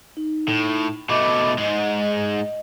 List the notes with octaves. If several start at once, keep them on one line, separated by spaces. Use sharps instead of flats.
D#4
A2
B2 A3 D#5 B5 D6
G#2 G#3 D#5